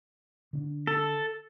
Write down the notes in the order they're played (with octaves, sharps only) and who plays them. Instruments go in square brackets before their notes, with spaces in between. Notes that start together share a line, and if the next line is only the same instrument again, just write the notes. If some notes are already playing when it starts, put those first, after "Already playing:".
[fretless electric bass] D3 C#4 D4
[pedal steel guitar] A4